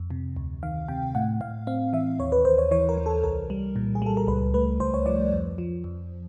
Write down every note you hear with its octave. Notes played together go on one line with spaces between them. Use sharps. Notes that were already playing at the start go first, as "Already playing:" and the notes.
Already playing: F2
C3
D2
D#3 F5
C3 G5
A2 F#5
A2 F5
C4 F5
E3 E5
D#2 C#5
B4
D#2 C5
C#5
E3 C#5
A#4
E3
A4
C2 A#4
G3
A#2
G#4
G3 A4
A#4
C#2 B4
A3 B4
C#2 C5
C#5
F3 D5
F2
F3
F2